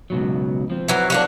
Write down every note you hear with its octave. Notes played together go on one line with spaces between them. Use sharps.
C#2 B2 F#3
F3 C4
E3 F#3
F#3 A#3 D4